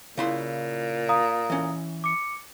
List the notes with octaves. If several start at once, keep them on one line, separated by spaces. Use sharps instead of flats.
A#2 C#3 E4 C6
F5 A#5 D#6
E3 C#4
D6 C#7